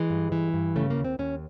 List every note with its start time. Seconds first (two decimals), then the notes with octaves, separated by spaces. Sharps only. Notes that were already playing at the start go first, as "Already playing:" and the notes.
Already playing: E3 G#3
0.10 G2
0.32 E3
0.54 G2
0.76 C#3 A3
0.90 A#3
0.97 D#2
1.05 C4
1.19 D#2 C#4